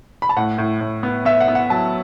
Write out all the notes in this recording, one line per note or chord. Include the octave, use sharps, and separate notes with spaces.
B5
A5
A2 F#5
A2
A2
B3
B3 E5
F#5
B3
F#5
F#3 A5